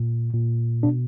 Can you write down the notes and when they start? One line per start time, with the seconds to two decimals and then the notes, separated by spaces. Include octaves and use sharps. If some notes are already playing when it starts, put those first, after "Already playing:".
Already playing: A#2
0.33 A#2
0.83 B2 D4